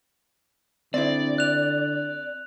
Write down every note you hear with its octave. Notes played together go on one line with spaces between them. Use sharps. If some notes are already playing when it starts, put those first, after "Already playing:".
D3 C4 E4 D5
F#6 F7